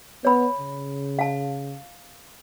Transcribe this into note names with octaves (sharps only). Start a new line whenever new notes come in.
B3 C#5 B5
C#3
F5 A5